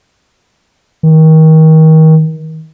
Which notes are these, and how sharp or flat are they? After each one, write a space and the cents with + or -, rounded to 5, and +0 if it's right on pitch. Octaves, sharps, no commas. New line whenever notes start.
D#3 +30